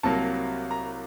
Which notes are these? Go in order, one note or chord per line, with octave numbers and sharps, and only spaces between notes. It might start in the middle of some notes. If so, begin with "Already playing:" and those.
C2 C3 F#3 A#3 A5
A#5